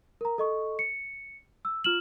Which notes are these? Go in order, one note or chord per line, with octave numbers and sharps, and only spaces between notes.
A#4 A#5
A4 D#5 C#6
C#7
E6
F4 F6 E7 F#7